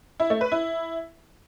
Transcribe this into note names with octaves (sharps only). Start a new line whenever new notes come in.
E4
A3
B4
E4